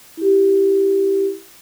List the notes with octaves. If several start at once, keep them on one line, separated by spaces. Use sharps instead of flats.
E4 G4